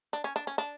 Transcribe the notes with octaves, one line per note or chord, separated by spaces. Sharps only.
D4
C#4
D4
C#4
D4